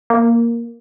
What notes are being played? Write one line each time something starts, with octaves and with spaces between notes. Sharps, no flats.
A#3